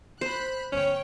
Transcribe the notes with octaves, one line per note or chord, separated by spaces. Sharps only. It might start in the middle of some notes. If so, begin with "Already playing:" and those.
C5 B5 F#6
G1 D2 C#4 C#5 G5